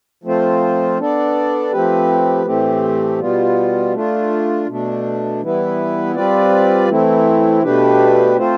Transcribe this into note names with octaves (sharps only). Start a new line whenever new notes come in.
F3 A3 C4 F4 C5
B3 D4 A4 D5
F3 A3 C4 G4 B4
A2 E3 A3 C4 G4
B2 G3 B3 F4
A3 D4 F4
B2 A3 D4
E3 G3 B3 E4 B4
G3 C4 F4 B4 D5
E3 A3 C4 E4
B2 A3 D4 G4 B4
A3 C4 F4 C5